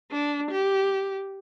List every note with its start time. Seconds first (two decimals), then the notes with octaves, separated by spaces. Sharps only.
0.12 D4
0.51 G4